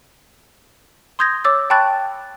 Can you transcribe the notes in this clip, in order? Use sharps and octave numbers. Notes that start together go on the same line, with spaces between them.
C6 D#6 G6 G#6 A#6
C#5 D6 E6 A6
G5 A5 B5 C#6 F#6 A6